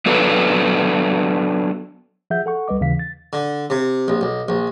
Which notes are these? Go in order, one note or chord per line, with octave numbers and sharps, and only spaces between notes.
F#3 B3 D4 F#4 A4 B4
F3 G#4 E5 F#5 G6
A4 F#5 C#6
C2 G3 B4 D#5 D6
D#2 C#3 E3 F5 B6
A6
D3
C3
A#1
B1
A#1